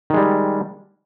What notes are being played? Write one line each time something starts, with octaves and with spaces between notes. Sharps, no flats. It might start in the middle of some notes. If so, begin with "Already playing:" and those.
D#3 G3 G#3